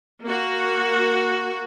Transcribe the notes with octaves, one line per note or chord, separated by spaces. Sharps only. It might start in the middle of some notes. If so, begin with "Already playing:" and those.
A#3 F#4